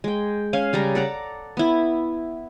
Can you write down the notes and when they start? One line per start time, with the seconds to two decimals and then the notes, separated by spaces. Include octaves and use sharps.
0.04 G#3 G5
0.53 C#4 F5 G#5
0.73 C#3 G3 G#4 A#5
0.95 A4 D5 F#5 A#5
1.57 B3 E4